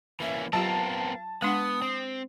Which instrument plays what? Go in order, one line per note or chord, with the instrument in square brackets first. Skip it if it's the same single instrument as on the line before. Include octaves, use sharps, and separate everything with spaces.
[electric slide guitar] E3 A#3 C#4 [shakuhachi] E5
[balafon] F#3 F4 G4 [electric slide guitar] B3 C4 A#4 [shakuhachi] F5 [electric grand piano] A5
[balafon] G#3 D4 F#5 [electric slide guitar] B3 [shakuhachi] D#6
[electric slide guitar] C4